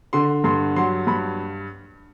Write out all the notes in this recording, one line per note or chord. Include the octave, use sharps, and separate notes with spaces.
D3 C6
G2 C6
F#3 C6
G2 B5